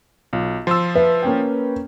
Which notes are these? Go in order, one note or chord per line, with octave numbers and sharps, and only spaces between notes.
B1 F4
F3 F4 C6 E6
B4 E5
A#3 C#4 G5